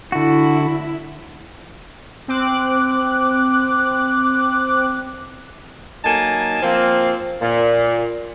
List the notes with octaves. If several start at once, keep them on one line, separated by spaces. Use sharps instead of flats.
D3 E4 F#4
C4 D6 F#6
F#3 A#3 D#4 G#5 A5
F3 A#3 C4
A#2